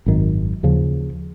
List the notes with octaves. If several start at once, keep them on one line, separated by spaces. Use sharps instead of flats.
G#1 F#2 D#3
D#2 C#3 F3